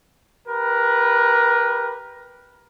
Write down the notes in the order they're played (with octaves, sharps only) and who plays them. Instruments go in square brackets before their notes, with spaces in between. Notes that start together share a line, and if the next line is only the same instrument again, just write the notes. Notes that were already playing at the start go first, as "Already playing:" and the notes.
[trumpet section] G4 A#4 B4